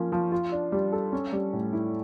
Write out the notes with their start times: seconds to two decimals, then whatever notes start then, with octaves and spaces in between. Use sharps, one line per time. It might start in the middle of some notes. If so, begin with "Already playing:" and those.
Already playing: F3 A#3 C#4
0.12 F3
0.32 F4
0.52 D4
0.72 G3
0.92 A4
1.12 C#4
1.32 G3
1.53 A2
1.73 E4